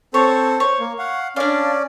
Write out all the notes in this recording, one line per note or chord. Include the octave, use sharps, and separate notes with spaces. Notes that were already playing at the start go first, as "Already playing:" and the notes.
C4 A4 C5 C#5
C5 C#5
A#3
F5 F#5
C#4 D4 D5 F5